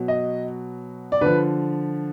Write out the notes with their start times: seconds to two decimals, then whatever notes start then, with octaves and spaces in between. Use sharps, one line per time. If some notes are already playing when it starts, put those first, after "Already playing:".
Already playing: B2 F#3
0.08 D#5
1.12 D5
1.21 D3 F3 B4